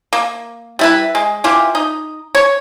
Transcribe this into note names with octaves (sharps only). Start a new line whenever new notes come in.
A#3
G3 E4 B4
G#3
E3 F4 G4
D#4
C#5